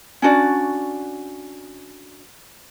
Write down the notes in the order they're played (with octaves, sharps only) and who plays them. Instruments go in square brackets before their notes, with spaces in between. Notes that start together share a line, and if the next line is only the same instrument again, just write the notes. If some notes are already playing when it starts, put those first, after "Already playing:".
[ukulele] C#4 D4 F#4 D5